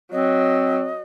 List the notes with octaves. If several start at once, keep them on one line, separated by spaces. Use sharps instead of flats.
F#3 C4 D#5